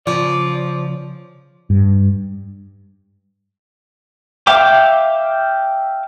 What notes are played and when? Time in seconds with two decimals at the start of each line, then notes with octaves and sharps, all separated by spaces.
0.07 C#3 F3 C#5 D5
1.70 G2
4.47 E5 F5 G5 D6